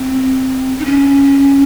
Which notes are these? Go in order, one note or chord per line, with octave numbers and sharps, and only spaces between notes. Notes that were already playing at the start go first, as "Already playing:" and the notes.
Already playing: C4
D#4
C#4